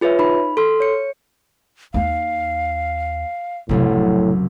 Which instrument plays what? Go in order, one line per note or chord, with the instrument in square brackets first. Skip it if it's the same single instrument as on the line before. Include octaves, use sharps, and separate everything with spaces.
[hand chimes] F4 G#4 B4 C#5 E5
D#4 B5
A4 C6 F6
C#5 C#7
[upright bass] D#2 D#4 [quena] F5
[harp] F#1 C2 F#3 [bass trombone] A2 [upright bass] C3 F3